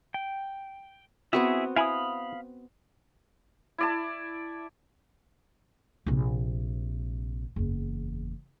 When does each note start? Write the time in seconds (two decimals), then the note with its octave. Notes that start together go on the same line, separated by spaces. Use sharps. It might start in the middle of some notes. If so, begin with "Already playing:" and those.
0.14 G5
1.33 B3 C4 E4 F#4 G#4 E5
1.76 E4 F5 G#5 B5 D#6
3.78 E4 D5 A5
6.06 A#1 C3
7.56 F#1 E2